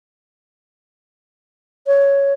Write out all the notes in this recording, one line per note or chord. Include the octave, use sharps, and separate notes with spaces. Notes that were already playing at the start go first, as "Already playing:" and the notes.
C#5